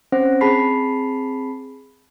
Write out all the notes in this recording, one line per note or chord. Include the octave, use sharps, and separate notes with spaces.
C4 C#4 C5 F#5 A#6
C4 G#4 A5 B5 B6 C7